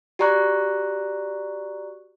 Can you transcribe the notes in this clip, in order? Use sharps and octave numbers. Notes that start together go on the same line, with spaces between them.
F#4 G4 D5 A#5 C#6 F#6